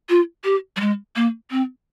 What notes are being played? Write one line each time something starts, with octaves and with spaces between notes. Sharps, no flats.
F4
G4
G3
G#3
A#3
C4